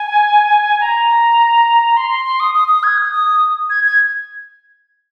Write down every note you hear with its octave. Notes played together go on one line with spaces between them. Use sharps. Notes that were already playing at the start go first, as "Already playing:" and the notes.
Already playing: G#5
A#5
C6
C6
C6
D#6
D#6
D#6
G#6
D#6
D#6
G#6
G#6